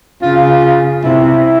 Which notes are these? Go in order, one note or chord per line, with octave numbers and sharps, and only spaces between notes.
C#3 F4
C3 E4